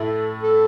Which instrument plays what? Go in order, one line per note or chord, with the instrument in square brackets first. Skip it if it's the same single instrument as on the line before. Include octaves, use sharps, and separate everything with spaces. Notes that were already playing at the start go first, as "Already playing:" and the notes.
Already playing: [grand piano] A2 A3 E4 [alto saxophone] A4
[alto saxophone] A4